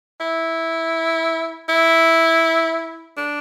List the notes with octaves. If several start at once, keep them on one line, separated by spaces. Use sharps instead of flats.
E4
E4
D4